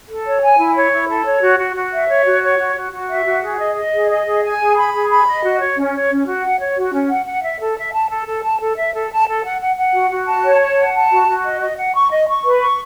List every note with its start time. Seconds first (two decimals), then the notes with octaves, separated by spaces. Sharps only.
0.08 A4
0.25 C#5
0.42 G#5
0.58 E4
0.75 C#5
0.92 E4
1.09 A4
1.25 C#5
1.42 F#4
1.58 F#4
1.75 F#4
1.92 E5
2.09 C#5
2.25 F#4
2.42 C#5
2.59 F#4
2.75 F#4
2.92 F#4
3.09 E5
3.25 F#4
3.42 G#4
3.59 D#5
3.75 D#5
3.93 G#4
4.09 D#5
4.26 G#4
4.43 G#5
4.59 G#4
4.76 B5
4.93 G#4
5.09 B5
5.26 D#5
5.43 F#4
5.59 C#5
5.76 C#4
5.93 C#5
6.09 C#4
6.26 F#4
6.43 F#5
6.59 C#5
6.77 F#4
6.93 C#4
7.09 F#5
7.26 F#5
7.43 E5
7.60 A4
7.77 E5
7.93 A5
8.10 A4
8.27 A4
8.43 A5
8.60 A4
8.77 E5
8.94 A4
9.10 A5
9.27 A4
9.44 F#5
9.60 F#5
9.77 F#5
9.93 F#4
10.10 F#4
10.27 A5
10.44 C#5
10.60 A5
10.77 F#5
10.93 A5
11.10 F#4
11.27 F#4
11.44 D#5
11.61 D#5
11.77 F#5
11.94 C#6
12.10 D#5
12.27 C#6
12.44 B4
12.61 C#6